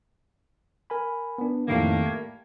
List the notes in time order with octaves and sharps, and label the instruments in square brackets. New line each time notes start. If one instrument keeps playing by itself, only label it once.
[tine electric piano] A#4 G#5 B5
B3 D4
[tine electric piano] F2 A2 D#3 [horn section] G3 A3 A#3
[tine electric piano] G#6